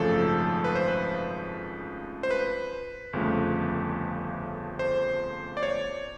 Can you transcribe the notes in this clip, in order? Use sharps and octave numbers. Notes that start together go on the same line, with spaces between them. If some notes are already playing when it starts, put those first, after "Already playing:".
Already playing: G#1 F#2 C#3 F3 A3 A4
B4
C5
B4
C5
B4
G1 F2 C#3 F3 A3
C5
D5
C#5